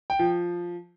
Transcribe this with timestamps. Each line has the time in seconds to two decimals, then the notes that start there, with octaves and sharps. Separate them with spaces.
0.10 G5
0.19 F3